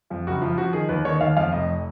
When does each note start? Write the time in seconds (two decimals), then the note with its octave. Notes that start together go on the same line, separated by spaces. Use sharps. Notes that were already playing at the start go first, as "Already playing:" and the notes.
0.10 F2 F4
0.27 F#1 F#4
0.42 F3 F4
0.58 F3 F#4
0.73 D#3 G#4
0.89 D#2 B4
1.05 D#3 C#5
1.21 D#2 F5
1.37 F2 F5
1.52 F1 D#5